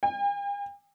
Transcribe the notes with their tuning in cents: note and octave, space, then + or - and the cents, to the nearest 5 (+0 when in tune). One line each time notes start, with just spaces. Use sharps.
G5 +45